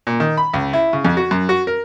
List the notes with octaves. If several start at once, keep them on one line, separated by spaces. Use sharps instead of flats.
A#2
D#3
B5
C#2
E4
C#3
F2
F#4
F#2
F#4
A#4